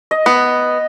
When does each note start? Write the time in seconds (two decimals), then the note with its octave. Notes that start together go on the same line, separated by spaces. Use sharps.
0.11 D#5
0.26 B3